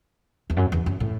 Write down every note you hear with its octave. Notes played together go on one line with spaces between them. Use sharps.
E2
F#2
E2
F#2
A2